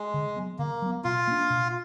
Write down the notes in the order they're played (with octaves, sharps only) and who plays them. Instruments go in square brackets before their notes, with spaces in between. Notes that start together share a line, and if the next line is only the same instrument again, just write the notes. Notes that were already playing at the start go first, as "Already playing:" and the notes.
Already playing: [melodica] G#3
[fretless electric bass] D3
F#3 B3
[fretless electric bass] D3 [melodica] A#3
[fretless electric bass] F#3 B3
[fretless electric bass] B2 [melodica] F4
[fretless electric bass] A#3 D4
B2